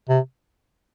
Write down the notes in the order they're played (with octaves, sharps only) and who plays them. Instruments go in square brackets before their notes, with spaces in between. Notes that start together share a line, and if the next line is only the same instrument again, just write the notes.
[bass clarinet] C3